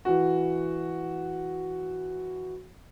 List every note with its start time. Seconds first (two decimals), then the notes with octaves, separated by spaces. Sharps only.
0.05 E3 F#4